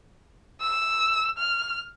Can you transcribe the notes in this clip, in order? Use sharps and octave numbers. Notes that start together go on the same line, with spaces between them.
E6
F6